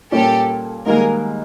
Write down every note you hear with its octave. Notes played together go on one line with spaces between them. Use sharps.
A#2 G3 A#3 C#4 G4 A4
G#2 D#3 G3 A#3 G#4 A#4